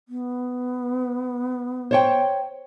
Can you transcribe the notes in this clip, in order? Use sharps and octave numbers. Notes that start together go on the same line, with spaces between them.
B3
C5 C#5 G5